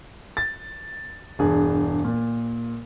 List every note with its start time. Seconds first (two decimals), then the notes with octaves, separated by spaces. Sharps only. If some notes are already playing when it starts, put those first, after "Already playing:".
0.37 A6
1.39 E1 G2 G#4
2.04 A#2